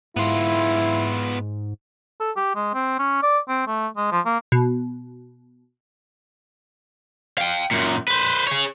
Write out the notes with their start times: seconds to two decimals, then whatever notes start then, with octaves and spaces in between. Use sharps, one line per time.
0.16 G#2 B3 E4 F4
2.20 A4
2.36 G4
2.55 G#3
2.74 C4
2.99 C#4
3.23 D5
3.48 C4
3.67 A3
3.96 G#3
4.12 F3
4.26 A#3
4.52 B2
7.38 F5 G5
7.71 F#2 A#2
8.08 B4 C5
8.47 G#4 C#5